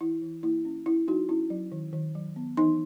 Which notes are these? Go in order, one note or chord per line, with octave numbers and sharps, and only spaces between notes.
E3 E4
E3
A#3 E4
C#4
C#4 E4
F#3 D#4 F#4
C#4 E4
F#3
D#3
D#3
F#3
B3
E3 D#4